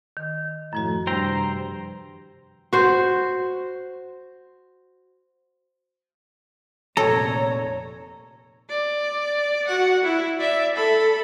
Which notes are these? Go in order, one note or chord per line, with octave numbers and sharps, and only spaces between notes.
D#3
F#2 A2 F3 F#4
G2 C3 C5 G5 A#5
F#4 C5
F1 A#2 A4 C#5 A#5
D5
F#4 F#5
E4
D5 E5
A4 B5